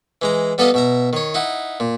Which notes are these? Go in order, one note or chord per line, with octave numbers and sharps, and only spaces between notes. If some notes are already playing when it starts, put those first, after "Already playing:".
E3 G#3 A#5
G3 B3 A4 B4 D#5 F5
B2 E5 A#5
D#3 C#5
D#4 E4 F#5
A#2